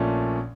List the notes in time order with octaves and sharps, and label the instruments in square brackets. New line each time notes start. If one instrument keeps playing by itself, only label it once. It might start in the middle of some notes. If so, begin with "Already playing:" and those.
Already playing: [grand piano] A#1 A#2 A3 C#4